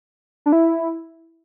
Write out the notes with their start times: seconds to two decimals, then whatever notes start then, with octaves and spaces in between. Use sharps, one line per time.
0.46 D4
0.52 E4